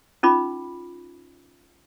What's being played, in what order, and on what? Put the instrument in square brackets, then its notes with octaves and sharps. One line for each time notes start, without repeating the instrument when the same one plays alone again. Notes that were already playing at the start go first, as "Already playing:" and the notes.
[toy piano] C#4 D#4 F4 B5 D6